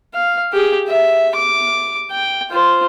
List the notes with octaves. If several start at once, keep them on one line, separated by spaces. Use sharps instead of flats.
F5
G4 G#4
E5
D6
G5
F4 C5